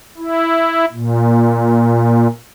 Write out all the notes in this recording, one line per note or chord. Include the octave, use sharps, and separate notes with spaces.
E4
A#2